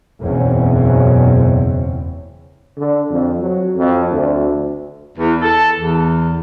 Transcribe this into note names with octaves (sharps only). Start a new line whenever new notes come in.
F#1 E2 B2 C4 C#4
D3
F2
F#3
F2
D2
E2
A4
E2